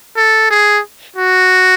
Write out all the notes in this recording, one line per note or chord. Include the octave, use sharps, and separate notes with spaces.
A4
G#4
F#4